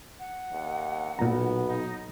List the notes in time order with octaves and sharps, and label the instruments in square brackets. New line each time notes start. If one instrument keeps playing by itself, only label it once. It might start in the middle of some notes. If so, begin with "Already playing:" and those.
[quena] F#5
[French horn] D#2
[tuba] B1 [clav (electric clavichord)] A#2 A#5 [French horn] B3
[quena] D#4